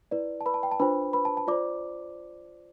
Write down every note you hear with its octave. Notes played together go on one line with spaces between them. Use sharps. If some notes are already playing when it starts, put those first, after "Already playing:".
E4 B4 D5
A5
B4 B5
A5
G5
A5
D4 F4 B4 C5 B5
B4 B5
A5
A5
F4 C5 D5 D6